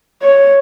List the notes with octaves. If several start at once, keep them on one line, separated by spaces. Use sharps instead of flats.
C#5